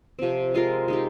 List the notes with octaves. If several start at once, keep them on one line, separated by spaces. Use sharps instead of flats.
C3 F3 C4
G#3 C4 F4 A#4
G#3 D#4 G4